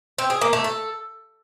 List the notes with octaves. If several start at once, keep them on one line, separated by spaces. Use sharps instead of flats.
C4
G#4
A#3
A3
A4